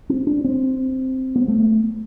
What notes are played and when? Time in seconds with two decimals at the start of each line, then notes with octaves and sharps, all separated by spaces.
0.09 C4
0.27 D4
0.44 C4
1.35 B3
1.48 A3